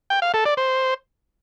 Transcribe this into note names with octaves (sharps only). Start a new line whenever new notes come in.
G5
F5
A4
D5
C5